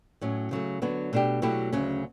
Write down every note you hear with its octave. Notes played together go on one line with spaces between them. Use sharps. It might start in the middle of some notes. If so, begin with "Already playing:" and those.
A2 F#3 C#4
C#3 F#3 A3
D3 F#3 B3 D4
B2 A3 D4 G4
B2 F#3 A3 E4 G4
D2 C#3 F#3 C#4